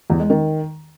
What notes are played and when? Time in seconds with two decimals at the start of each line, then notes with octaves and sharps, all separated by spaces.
0.10 E2
0.20 G#3
0.30 D#3